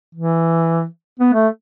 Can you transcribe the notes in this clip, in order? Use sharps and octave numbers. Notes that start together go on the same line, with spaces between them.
E3
B3
A3